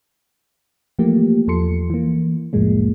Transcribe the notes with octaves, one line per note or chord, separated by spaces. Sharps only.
E3 F3 A3 A#3 G4
E2 F3 A4 C6 C#7
E3 A#3
C2 F2 A2 F3 G#3 A#3